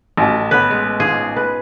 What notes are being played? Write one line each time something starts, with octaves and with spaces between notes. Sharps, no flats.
A1 F#4 A5
B3 C#4 B4
G#3
G#2 F4 G#4
B4